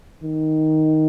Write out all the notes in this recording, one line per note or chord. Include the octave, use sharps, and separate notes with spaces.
D#3